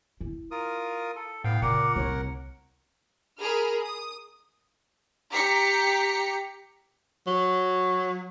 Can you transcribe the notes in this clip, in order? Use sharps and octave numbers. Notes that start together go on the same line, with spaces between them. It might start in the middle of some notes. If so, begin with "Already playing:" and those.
E4
F4 A#4 D#6
A4
A2 B3 F5 G5
A#2 C#3 A#4 F#5 D6
C2 C#5
G#4 A#4 B5 F6
D#6
G4 A#5 B6 C#7
F#3